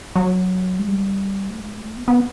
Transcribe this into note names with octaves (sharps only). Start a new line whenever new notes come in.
F#3
G#3
G3
A3
G#3
A3
B3
B3